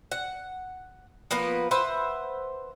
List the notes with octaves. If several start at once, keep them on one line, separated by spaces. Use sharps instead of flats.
F#5
F3 A#3 B3 B4
B4 C5 E5 F#5